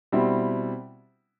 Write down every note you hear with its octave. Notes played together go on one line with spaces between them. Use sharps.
B2 G3 C4 E4